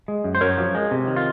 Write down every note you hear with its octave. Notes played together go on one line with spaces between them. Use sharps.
G#3
F#2
C5
F#2 A#4 C#5
F3
G#3
C3
D#3
F4